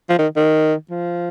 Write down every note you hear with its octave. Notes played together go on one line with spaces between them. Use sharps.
F3
D#3
D#3
F3